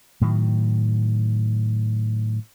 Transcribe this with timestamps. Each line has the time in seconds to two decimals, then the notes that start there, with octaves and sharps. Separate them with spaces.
0.21 A2 D#3 F#3